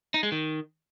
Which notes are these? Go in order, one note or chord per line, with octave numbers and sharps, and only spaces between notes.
D#4
G#3
D#3